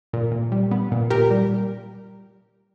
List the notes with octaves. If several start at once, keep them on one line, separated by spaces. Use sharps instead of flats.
A#2
A#2
G3
B3
A#2
A#2 G4 A#4
G3